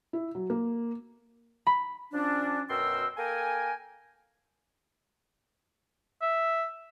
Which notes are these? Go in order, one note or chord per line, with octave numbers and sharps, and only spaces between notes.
E4
F#3
A#3
B5
F3 C#4 D4
F#2 B2 A#4 G5 C6 E6
A#3 A4 A#4 G5 G#5
E5